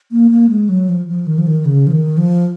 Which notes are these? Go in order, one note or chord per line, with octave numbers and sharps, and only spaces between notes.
A#3
A#3
G#3
F#3
F3
F3
D#3
F3
D#3
C#3
F3
D#3
F3